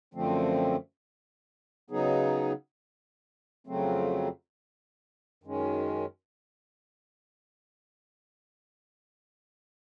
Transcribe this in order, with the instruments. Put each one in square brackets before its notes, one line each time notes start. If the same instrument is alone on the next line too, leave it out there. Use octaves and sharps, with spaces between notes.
[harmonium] F#2 D3 F3 A3 C4
C#3 F#3 B3 D#4 G#4
F2 C#3 F#3 A3 C4
F#2 D#3 G#3 C#4